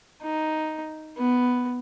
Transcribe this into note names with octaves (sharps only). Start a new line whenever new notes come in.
D#4
B3